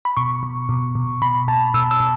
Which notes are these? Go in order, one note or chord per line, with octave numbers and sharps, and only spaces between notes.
B5
B2 C#6
B2
B2
B2
B2 B5
B2 A5
B2 E6
E6
B2